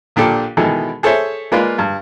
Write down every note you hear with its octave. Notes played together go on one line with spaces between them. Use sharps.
A#1 A#2 D4 G4 A4
B2 D#3 E3 G#3 E4 A4
G#4 A4 C5 C#5 E5
G#3 A#3 F4 B4 D5
G2